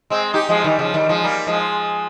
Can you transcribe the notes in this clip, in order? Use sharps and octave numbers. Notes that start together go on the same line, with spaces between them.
G#3 C4
D#4 G4
F3 G#3
D#3 G3
C#3 F3
D#3 G3
F3 G#3
G3 A#3
F3 G#3